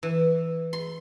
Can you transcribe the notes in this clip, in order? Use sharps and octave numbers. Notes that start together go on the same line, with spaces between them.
E3
C6